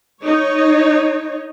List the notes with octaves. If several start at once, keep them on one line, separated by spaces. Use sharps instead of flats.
D#4 C#5